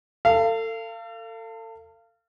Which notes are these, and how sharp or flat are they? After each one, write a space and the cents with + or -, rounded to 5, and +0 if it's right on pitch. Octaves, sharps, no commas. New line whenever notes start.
A4 +35 F5 -25